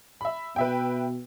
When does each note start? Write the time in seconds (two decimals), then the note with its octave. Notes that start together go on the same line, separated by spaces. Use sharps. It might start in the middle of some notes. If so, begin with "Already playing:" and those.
0.21 E5 B5
0.56 B2 B4 E5 G5